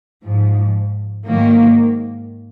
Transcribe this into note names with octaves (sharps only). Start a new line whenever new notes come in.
G#2 F3
G#2 D#3 F#3 A#3